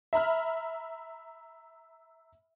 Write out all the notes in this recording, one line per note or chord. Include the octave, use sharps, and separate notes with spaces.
E5 A#5 B5 F6